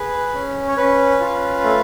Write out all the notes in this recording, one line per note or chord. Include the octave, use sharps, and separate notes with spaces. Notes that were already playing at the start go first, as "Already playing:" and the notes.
Already playing: G#4 B4
C#4
C#5
C#4 B4
F4
A3